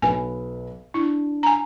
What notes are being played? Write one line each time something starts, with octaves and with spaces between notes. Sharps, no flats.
B1 B4 G#5
D4 E4
G#5 A#5